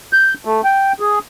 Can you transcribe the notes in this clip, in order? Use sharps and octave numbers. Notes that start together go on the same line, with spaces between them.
G6
A3
G5
G#4